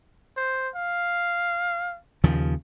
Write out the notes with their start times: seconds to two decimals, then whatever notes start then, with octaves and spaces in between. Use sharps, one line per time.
0.37 C5
0.75 F5
2.24 D#2 C#3 F3